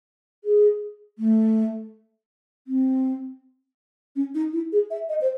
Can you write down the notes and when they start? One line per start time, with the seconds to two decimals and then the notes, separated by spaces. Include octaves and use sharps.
0.44 G#4
1.19 A3
2.67 C4
4.16 C#4
4.35 D#4
4.53 E4
4.72 G#4
4.91 E5
5.09 D#5
5.21 C5